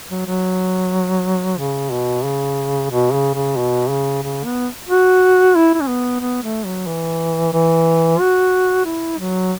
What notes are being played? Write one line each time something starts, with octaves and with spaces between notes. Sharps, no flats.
F#3
F#3
C#3
B2
C#3
B2
C#3
C#3
B2
C#3
C#3
B3
F#4
E4
E4
C#4
B3
B3
A3
F#3
E3
E3
F#4
E4
F#3